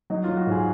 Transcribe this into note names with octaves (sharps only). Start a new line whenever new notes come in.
F#3 D#4
F#3 F4
F#4
G#2 G#4